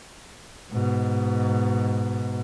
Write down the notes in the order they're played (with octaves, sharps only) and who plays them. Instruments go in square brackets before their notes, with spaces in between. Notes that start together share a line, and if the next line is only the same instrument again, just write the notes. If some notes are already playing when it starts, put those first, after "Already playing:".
[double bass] G#2 B2